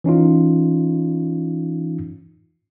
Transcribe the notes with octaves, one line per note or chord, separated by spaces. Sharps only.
E3 C#4 D#4 F4